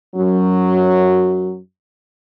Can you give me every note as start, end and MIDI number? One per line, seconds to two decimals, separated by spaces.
0.14 1.57 42
0.14 1.57 54